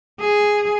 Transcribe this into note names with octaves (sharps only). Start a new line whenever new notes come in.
G#4